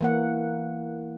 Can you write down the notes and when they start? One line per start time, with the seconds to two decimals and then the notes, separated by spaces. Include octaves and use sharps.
0.01 E3 A#3 F#5